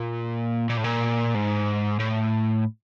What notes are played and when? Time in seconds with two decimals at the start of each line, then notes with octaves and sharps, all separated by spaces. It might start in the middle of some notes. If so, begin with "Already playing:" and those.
Already playing: A#2
0.69 A#2
0.77 A2
0.84 A#2
1.35 G#2
1.99 A2